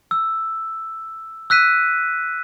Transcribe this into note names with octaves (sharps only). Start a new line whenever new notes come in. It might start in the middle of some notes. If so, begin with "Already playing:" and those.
E6
E6 F#6 B6 D#7